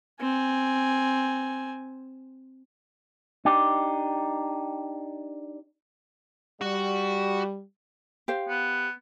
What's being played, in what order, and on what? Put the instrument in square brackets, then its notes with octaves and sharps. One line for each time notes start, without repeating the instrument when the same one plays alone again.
[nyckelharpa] C4 G#5
[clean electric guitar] D4 D#4 G4
[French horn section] G3 [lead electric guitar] F#4
[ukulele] G4 C5 F5
[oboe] B3